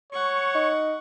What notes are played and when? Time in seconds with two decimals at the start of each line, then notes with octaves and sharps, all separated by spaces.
0.13 C#5 F#5 C#6
0.55 D#4